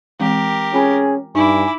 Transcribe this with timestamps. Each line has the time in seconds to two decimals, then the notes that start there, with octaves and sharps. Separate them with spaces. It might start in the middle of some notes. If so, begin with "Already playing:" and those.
0.20 E3 G#3 C4 G4 A#4
0.73 C#4 F4 G#4 G#5 B5
1.35 G2 D#4 E4 G#5 D6